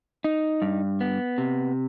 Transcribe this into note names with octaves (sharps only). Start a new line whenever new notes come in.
D#4
G2
B3
C3